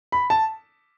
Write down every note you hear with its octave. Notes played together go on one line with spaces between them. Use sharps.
B5
A5